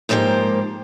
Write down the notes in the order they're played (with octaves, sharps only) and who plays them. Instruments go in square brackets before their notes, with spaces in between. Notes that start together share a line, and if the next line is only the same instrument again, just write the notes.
[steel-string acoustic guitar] G#2 F3 A#3 G4 C5